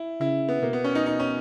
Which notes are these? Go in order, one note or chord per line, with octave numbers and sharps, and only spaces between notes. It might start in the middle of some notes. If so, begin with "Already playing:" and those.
Already playing: E4
C#3 E4
B3
B2 A#3
B3
C#4
D#4
D#4
C#4